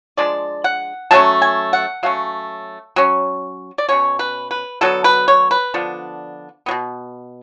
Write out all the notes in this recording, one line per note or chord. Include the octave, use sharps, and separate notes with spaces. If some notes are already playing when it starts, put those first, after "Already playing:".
F3 G#3 D4 D5
F#5
F#3 A3 C#4 A5
G#5
F#5
F#3 A3 C#4 F5
F#3 C#4
D5
B2 A3 C#4 C#5
B4
B4
D3 F#3 B3 A4
B4
C#5
B4
D3 F3 B3 D4
B2 F#3 B3